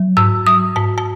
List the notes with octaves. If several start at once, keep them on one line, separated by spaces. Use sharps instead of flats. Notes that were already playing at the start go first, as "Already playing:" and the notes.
Already playing: F#3
G#2 E6
F#3 D#6
G#2 A5
A5